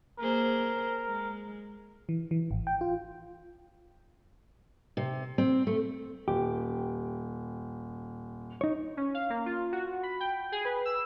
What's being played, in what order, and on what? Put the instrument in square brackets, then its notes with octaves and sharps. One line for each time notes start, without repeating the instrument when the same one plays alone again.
[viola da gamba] A#3 G#4 C5 [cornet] A#4
[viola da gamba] G#3
[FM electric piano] E3
E3
G#1
G5
F4
[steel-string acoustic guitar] C3
C4
A3
[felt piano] D#1 [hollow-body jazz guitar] G4
[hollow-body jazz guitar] D#4 C#5
[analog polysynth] C#4
F5
A#3
F4
F#4
B5
G5
G#4
B4
E6